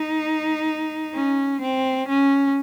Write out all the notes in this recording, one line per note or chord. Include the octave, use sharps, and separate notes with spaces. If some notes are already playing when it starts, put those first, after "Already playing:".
Already playing: D#4
C#4
C4
C#4